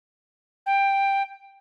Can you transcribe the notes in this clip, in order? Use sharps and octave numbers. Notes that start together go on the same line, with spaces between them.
G5